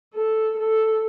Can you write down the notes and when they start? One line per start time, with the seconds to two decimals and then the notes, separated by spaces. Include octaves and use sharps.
0.14 A4
0.58 A4